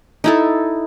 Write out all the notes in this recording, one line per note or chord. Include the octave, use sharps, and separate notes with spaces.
D#4 E4 A4